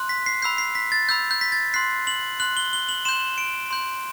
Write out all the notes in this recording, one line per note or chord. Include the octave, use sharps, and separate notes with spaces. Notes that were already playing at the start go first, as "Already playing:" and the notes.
Already playing: C6 F#6
B6
C7
B5 E6 G6 C7
C7
B6
A6
B5 E6 G6
G6
B6
A6
C6 F#6 C7
F#7
C6 F#6 F#7
G7
G7
F#7
C6 G6 E7
D7
C6 G6